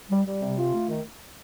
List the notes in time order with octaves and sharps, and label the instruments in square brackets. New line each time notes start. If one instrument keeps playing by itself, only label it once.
[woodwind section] G3
G3
C3
F4
A3
D#3